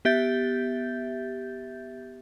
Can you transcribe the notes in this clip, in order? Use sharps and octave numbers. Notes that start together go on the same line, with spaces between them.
B3 G4 E5 G6 A6